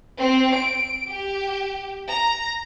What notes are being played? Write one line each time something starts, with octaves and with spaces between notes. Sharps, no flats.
C4
D7
G4
A#5